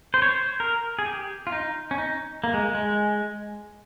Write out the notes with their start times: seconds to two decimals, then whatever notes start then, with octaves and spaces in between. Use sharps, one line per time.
0.14 C5
0.22 C#5
0.29 C5
0.60 A#4
0.99 G#4
1.06 G4
1.47 F4
1.52 D#4
1.91 C#4
1.98 D#4
2.44 A#3
2.54 G#3
2.75 G#3